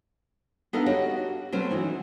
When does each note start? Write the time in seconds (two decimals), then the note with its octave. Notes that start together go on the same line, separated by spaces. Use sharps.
0.73 B3 D4 D#4 A4 D#5 F5
0.86 F#4 G4 C#5 D#5 F#5
1.52 B2 F#3 A3 C4 C#4 C5
1.71 E3 D#4 F#4